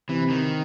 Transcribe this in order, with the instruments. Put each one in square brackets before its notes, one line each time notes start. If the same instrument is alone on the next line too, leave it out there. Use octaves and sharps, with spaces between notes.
[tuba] C3 [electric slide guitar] E3
[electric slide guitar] D#3